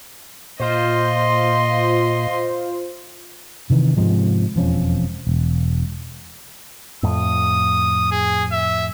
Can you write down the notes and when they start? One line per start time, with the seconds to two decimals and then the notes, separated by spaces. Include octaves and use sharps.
0.60 A#2 F4 C5 D#5 C6
3.70 C3 D#3 E3
3.97 G#2 C3 F3 G#3
4.56 E1 F2 F3 C#4
5.27 E1
7.03 F2 A2 D#6
8.11 G#4
8.52 E5